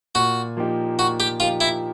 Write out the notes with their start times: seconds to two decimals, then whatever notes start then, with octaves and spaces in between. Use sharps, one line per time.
0.15 A#2 F#4
0.57 F3 A#3 D#4 G4
0.98 A#2 F#4
1.20 G4
1.40 F3 A#3 D#4 F4 G4
1.61 E4